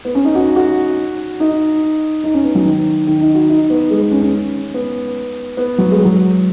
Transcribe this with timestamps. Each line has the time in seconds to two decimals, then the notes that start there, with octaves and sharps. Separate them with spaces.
0.05 B3
0.15 C#4
0.25 D#4
0.35 F#4
0.56 F#4
1.40 D#4
2.24 D#4
2.34 C#4
2.44 B3
2.55 F#3
2.66 D#3
3.07 D#3
3.21 D#4
3.35 F#4
3.49 D#4
3.70 B3
3.91 G#3
4.01 B3
4.12 C#4
4.22 C#4
4.74 B3
5.57 B3
5.78 F#3
5.91 G#3
6.05 F#3